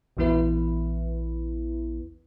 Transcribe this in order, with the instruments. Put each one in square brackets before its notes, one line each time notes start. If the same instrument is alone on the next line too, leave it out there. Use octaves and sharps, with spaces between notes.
[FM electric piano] A#1 E2 E3 B3 E4 B4